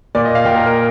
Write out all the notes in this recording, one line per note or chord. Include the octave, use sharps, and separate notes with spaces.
A#2 D5
D#5
F5
A#2 G5
A#4
A#4